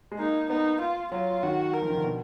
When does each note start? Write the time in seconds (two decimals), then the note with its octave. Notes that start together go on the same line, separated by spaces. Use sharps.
0.12 G#3
0.19 A#3 D#4
0.50 B3 D#4
0.81 F4
1.12 F#3 F4
1.43 D#3 F#4
1.74 A#4
1.82 F3
1.90 D#3
1.97 D3
2.04 B2